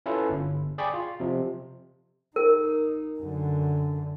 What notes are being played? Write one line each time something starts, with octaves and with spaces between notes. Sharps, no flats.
C#4 E4 F4 A4 B4
G1
G#4 D5 G5 G#5 B5 C#6
F4
C3 F3
D#4 A#4
F#2 D3